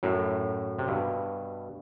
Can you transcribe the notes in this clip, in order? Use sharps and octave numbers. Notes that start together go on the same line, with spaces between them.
F#2 A2
C3
G2 B2